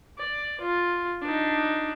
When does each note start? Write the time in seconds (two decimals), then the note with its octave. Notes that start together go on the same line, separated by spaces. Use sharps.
0.18 D5
0.61 F4
1.21 D4 D#4